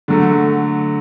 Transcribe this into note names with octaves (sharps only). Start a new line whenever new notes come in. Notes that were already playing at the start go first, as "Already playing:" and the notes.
D3 F#3 A3